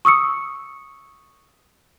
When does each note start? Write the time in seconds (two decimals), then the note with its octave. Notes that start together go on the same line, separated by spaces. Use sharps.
0.05 C#6 D#6 E6 C#7